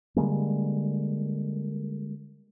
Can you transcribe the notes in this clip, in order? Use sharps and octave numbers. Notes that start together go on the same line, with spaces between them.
D3 G3 G#3 A#3